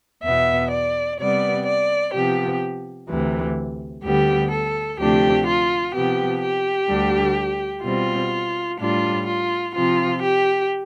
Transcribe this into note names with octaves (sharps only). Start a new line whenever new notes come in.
E2 B2 B3 E5
D5
C3 G3 B3 D5
D5
C3 F3 B3 G4
D2 C3 E3
D2 D3 G3 B3 G4
A4
D2 C3 F3 A3 D4 G4
F4
C3 F3 B3 G4
G4
D2 D3 G3 D4
B2 G3 C4 F4
A2 G3 D4 F4
F4
C3 F3 C4 F4
G4